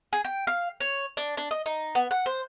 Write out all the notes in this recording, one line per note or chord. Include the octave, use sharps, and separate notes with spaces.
G#4
G5
F5
C#5
D4
D4
D#5
D#4
B3
F#5
C5